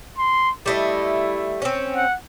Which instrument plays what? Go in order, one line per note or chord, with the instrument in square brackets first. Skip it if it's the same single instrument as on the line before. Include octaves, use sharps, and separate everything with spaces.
[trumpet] C6
[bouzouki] G3 A3 D#5 [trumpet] E4
[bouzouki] C4 C#4
[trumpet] F#5